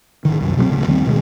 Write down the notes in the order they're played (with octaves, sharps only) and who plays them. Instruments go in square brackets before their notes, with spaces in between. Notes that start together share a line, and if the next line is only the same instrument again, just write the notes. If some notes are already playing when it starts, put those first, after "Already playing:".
[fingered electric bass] A1 D#3
C2 F#2
B2 F#3 G3 C4
D1 C#2
D2 D#3 G3 C4
D1 B2 D#3 G#3